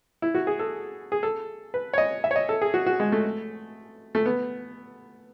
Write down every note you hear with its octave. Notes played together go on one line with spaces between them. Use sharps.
E4
F#4
G#4
A4
G#4
A4
B4
C#5
D#5
E5
C#5
D#5
A4
G#4
F#4
F#4
G#3
A3
A3
B3